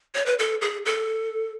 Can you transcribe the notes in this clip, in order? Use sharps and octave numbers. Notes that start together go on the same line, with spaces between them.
C#5
B4
A4
G#4
A4